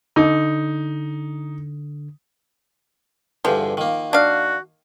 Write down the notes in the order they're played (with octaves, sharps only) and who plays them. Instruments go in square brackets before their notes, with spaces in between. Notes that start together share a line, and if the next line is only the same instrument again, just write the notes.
[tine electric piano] D3 [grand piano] D#4
[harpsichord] E2 G2 D3 [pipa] F3
[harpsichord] D#3 A#3
[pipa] D4 F5 [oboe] F#4